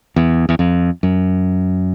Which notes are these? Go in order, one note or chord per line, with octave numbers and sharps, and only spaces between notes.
E2
E2
F2
F#2